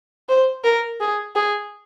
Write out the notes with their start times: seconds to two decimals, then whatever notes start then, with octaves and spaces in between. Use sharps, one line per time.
0.29 C5
0.64 A#4
1.01 G#4
1.36 G#4